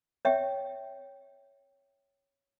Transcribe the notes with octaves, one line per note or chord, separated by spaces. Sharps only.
C#5 E5 G5